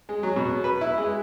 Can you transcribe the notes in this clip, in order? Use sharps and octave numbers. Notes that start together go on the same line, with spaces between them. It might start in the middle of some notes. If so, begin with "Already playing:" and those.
G#3
F#3
B2
B4
E4
G#3